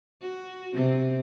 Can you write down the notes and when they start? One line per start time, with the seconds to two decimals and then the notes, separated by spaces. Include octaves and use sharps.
0.21 F#4
0.74 C3 C4